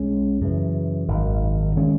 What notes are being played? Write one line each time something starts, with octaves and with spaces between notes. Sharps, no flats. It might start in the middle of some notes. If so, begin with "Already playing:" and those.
Already playing: B1 G#3 C#4
F#2 C#3 E3
G#1 F#2 D#3
D#3 G#3 C#4